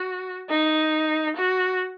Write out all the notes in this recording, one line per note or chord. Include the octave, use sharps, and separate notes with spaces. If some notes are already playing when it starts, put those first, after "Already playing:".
Already playing: F#4
D#4
F#4